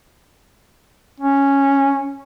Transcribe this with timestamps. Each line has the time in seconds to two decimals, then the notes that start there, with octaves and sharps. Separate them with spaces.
1.20 C#4